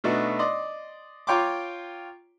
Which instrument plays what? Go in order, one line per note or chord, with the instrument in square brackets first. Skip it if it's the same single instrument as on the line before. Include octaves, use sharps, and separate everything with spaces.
[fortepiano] B2 A3 B3 D4 D#4 F#4
D5 D#5 C6
F4 C#5 G5 A#5 C6 D6